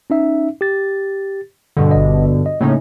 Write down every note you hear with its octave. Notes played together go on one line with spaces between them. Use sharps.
C#4 D#4 E5
G4 A6
G2 B2 D3
G1 D#5
D#5
A2 C#3 A#3 C#4 D#4